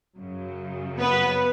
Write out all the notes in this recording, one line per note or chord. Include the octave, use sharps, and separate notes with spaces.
F#2 C#3 F#3
B3 B4